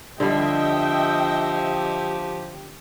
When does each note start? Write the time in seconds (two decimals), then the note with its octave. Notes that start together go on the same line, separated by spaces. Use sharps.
0.20 D3 F3 G3 G4 D#5 E5 G5